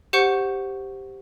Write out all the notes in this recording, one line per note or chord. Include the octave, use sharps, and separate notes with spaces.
G4 C5 F#5 C#6 G6 C#7